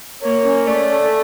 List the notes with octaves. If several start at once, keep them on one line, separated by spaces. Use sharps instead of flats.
A#3 C#5
C#4
A3 D5
A4